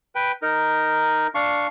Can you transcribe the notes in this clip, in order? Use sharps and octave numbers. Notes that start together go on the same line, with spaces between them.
B4 G5
D#4 A#4
D4 F5 C#6